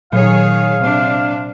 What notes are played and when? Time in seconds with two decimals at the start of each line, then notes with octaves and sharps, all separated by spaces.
0.13 A#2 D#3 F#3 G#4 C#5 F5
0.82 C3 D4